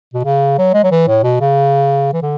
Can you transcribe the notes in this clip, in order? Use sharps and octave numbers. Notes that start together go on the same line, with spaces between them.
B2
C#3
F#3
G#3
F#3
E3
A2
B2
C#3
E3
D3